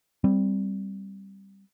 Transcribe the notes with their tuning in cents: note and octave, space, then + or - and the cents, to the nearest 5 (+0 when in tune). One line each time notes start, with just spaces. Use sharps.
G3 +0 C4 +0